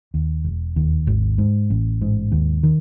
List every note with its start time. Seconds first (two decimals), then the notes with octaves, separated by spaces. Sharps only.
0.14 D#2
0.44 E1
0.76 D#2
1.07 G#1
1.38 G#2
1.70 A1
2.01 G#2
2.32 D#2
2.63 D#3